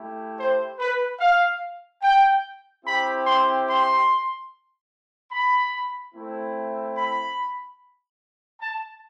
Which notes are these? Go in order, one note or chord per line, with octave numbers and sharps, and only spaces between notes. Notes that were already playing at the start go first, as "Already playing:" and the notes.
Already playing: A3 E4 G4
C5
B4
F5
G5
C4 E4 G4 B5
C6
C6
B5
A3 C4 E4
B5
A5